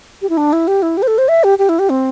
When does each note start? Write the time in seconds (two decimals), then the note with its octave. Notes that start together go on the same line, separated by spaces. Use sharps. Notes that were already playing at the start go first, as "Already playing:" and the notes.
0.22 G4
0.30 E4
0.37 D4
0.53 E4
0.68 G4
0.82 E4
0.97 G4
1.02 C5
1.07 A4
1.18 C5
1.28 E5
1.44 G4
1.59 G4
1.69 E4
1.79 G4
1.90 C4